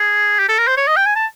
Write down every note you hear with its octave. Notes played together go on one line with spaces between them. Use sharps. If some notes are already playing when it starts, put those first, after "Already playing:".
Already playing: G#4
G4
A4
A#4
C5
C#5
D#5
G5
G#5
A5